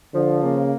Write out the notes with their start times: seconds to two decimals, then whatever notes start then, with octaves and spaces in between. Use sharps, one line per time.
0.14 D3 F3
0.43 C#3 A#3